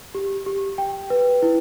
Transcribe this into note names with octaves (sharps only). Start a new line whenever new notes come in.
G4
G4
G5
B4
E4